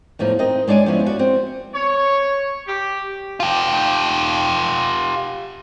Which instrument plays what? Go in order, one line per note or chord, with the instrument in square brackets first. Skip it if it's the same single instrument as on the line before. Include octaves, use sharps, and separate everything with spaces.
[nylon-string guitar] E2 A2 F3 D#4
C4 D#4 A#4 D#5
G#3 D4 C#5 D5 G#5
F3 B3 C#4 E4
F#4 D5
C4
[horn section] C#5
G4
[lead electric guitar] F4 G4